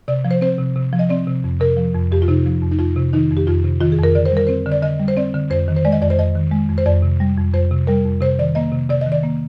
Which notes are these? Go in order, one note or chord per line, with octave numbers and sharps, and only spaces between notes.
C3 D5
F3
C5
C4 C5
C3
C3
F3
D#5
C4 D5
C3
F2
C3 A#4
F3
F2
F2 G4
F4
C3 D#4
F3
F2
D#4
F2 F4
C3
D#3 D#4
F2
G4
F2 F4
C3
D#3 F4
G#4
F2
A#4
D3 D5
C5
G3
A#4
C4 C5
D3
D5
D3 D#5
G3
C5
C4 D5
D3
F2 C5
D#3
C5
G#3 D5
D#5
F2 D5
C5
F2 D#5
D#3
G#3
F2
C5
F2 D5
C3
G3
F2
F2 C5
C3
G3 A#4
F2
C3 C5
D#3 D5
A#3 D#5
C3
C3 D5
D#5
D#3
D5
A#3